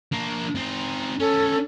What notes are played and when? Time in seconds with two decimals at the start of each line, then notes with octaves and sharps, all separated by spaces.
0.12 A#3 D4
0.55 C4 D#4
1.20 B3 C#4 A4